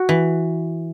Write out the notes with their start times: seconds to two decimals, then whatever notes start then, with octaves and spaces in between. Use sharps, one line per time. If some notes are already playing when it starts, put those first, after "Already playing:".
Already playing: F#4
0.09 E3